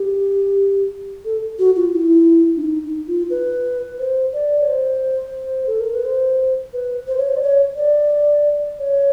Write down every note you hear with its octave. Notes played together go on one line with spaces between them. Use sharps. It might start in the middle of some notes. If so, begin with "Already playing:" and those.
Already playing: G4
A4
F#4
F4
E4
D4
D#4
D#4
F4
B4
C5
D5
C#5
C5
A4
A#4
B4
C5
B4
C5
C#5
C5
D5
C#5
D5
C#5